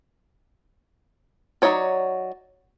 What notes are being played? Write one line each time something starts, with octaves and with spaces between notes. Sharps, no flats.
F#3 A3 D#4 C#5 D5